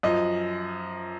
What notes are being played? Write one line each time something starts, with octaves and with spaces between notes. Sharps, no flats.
F#2 F3 D#5